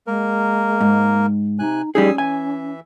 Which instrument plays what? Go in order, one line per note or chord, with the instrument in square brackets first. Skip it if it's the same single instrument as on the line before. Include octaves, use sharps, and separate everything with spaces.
[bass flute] G#3 [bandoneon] A#3 A#4
[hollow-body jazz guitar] G#2
[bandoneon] C3 G#5 F#6 [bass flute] D#4
[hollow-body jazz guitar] G3 D#4 G#4 [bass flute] C#4 [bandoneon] G#5 D#6 E6
[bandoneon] E3 E5 [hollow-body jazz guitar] G#5